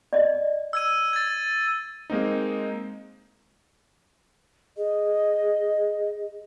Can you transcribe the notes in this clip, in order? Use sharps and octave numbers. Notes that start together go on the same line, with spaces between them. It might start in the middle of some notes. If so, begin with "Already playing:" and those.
D5 D#5
E6 G#6 D#7
G#6 A6
G#3 A#3 C4 D#4
G#4 D#5